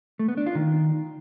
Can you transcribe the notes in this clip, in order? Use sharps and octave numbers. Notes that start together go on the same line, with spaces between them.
A3
B3
D4
F4
D#3